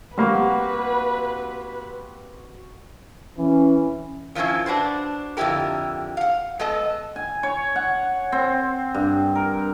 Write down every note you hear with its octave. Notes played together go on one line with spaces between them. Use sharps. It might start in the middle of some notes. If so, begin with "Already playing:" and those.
G3 A#3 C4 F#4 B4
E3 C#4
D#3 F3 A#3 C4 C#4 E4
D4 F#4 B4 C5
F2 D3 C4 E4 G4 A#4
F5 F#5
G#3 B3 A4 D#5
G#5
C#5
F#5
C4
G2
A#4